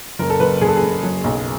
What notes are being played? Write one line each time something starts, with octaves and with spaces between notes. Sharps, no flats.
F#1 A#4
A4
F#1 B4
F#1 G#4
A4
G#4
F#1
F#3
B1